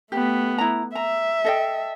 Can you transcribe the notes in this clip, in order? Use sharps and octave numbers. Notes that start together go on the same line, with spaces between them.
A3 B3 G4
E4 A#5
E5 A#5
A4 D#5 G5